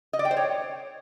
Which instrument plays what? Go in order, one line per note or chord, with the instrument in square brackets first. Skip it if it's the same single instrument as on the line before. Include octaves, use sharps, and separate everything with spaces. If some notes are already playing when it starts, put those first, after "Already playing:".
[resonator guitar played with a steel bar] D#5
D5
G5
C5
C#5